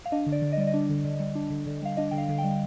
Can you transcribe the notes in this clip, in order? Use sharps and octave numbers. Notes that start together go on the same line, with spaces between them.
F5
D4 D#5
D3
D5
D3
D#5
G3 D5
D#5
D4
D3
D3
G3
D4
D3
D3
G3 F5
D4 D#5
D3 G5
F5
D3
G5
G3